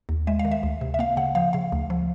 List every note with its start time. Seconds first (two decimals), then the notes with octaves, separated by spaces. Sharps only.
0.09 D#2
0.27 G#3 E5
0.39 F5
0.45 D#3
0.51 E5
0.63 D2
0.81 C3
0.94 E5
0.99 A#3 F5
1.17 C#3 F#5
1.35 F3 F5
1.53 C#3 F5
1.72 D2
1.90 F3